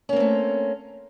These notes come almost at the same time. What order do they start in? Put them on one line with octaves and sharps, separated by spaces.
C#4 A#3 C4 A3